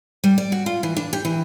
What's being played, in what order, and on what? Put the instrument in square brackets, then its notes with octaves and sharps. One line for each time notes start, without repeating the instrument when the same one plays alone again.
[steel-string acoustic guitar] G3
D5
F#4
F4
E3
D4
G4
E3